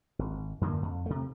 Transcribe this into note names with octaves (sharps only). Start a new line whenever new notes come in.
G#1
F#2 D3 E3 A#3
F2
C3 A3